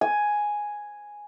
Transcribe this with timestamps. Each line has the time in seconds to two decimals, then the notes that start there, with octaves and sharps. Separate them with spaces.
0.01 G#5